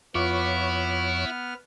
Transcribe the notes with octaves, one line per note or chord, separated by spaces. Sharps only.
F2 B3 E4 F4 C#5 C#6 D6 F6